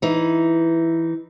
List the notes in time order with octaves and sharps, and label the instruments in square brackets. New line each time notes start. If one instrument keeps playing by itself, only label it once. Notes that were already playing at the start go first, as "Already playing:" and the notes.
[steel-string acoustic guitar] E3 D#4